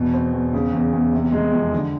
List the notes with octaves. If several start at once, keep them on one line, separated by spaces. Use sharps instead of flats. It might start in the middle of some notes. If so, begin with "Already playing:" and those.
Already playing: E2 B2
C4
E2
C#3
E2
E2
C3
G#3
F2
D3